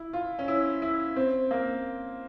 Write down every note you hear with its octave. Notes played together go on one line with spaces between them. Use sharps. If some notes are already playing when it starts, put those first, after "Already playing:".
Already playing: E4
F4
C#4
E4
E4
C4
A#3